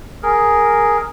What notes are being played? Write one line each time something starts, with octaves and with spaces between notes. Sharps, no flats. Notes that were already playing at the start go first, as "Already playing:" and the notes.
G#4 A#4